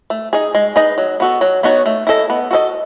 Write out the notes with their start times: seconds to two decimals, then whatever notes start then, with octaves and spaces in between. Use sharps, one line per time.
0.10 A3
0.33 D#4 G#4
0.55 G#3
0.76 D#4 G#4 B4 D#5
0.98 F#3
1.20 B3 F#4 A4
1.41 F#3
1.63 B3 D#4 F#4 C#5
1.86 A3
2.07 E4 A4 D#5
2.30 B3
2.51 F#4 A4 D#5